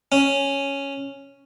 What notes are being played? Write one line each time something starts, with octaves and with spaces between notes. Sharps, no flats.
C#4